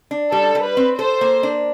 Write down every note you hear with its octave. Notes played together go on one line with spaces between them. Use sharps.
D4
G3 A4
G3
B4
C4
A4 C5
A#3
D4